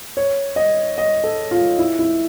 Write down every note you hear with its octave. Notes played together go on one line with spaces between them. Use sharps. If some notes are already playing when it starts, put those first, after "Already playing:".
C#5
D#5
D#5
A4
F4
E4
E4